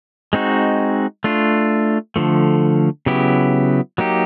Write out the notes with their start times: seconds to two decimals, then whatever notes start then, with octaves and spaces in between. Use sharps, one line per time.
0.33 G#3 C4 D#4 F#4
1.24 A3 D4 F4
2.16 D3 F3 A3
3.06 C#3 F#3 B3 E4 G4
3.98 F#3 A#3 D#4 G4